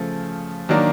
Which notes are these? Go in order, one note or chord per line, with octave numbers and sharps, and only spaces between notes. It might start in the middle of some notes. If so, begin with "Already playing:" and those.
Already playing: C#3 F3 A3
D#3 F#3 A#3 D4